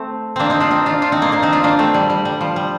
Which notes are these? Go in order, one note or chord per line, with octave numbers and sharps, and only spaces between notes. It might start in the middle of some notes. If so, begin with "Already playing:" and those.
Already playing: A3 C4
A#3 C4 D4
C4 D#4
D4 F4
C4 D#4
D4 F4
D4 F4
C4 D#4
A#3 D4
A#3 D4
C4 D#4
D4 F4
A#3 D4
A3 C4
G3
G3
G3
F3
G3